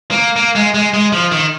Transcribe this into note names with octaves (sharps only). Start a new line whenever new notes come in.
A#3
A#3
G#3
G#3
G#3
F3
D#3